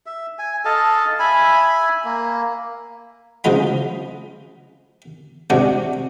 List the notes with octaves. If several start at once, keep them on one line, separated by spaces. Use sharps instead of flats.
E5
G#5
A4 D#5 F5 A5
E5 G#5 B5
A#3
C#3 F3 F#3 G#3 F4 B5
C3 G#3 D4 F#4 C#6